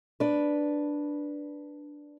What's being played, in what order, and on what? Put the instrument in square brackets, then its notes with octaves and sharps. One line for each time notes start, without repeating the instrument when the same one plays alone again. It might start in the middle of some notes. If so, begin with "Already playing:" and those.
[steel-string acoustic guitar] D4 B4